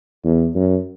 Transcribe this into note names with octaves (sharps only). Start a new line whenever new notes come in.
E2
F#2